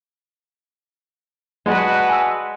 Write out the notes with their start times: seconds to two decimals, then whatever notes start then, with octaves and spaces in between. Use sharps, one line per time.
1.66 G#3 F#4 B4 D5 F#5 A5
2.09 G#5 E6